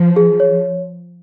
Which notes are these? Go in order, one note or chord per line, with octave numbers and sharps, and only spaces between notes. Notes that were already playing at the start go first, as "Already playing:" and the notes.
Already playing: F3
G#4
C#5